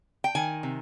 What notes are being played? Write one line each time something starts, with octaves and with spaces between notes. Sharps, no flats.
G5
D#3 G#5
C3